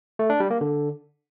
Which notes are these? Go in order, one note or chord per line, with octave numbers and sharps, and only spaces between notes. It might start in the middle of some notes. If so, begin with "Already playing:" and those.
A3
D4
G3
A#3
D3